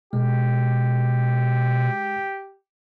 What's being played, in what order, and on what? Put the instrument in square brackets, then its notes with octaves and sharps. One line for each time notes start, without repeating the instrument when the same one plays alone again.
[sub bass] B2 [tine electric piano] G#3 [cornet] G4